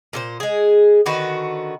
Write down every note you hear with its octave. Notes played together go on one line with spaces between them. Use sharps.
A#2 A4 C5
G#3 G#4
D3 D#3 F#4 B4